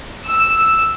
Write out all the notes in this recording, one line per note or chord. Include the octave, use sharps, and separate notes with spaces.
E6